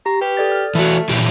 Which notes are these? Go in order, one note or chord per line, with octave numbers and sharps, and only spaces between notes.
G4 A#5
G4 B4
A4 D5 A6
F6
E3 A3 F#4
A#2 E3 G4